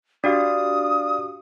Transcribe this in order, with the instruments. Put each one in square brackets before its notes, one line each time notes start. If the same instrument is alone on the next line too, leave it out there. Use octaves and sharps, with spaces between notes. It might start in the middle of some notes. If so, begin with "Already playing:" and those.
[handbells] D4 F#4 G4 [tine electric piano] D5 F5 [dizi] D#6